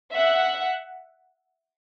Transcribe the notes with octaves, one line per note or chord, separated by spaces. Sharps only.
E5 F#5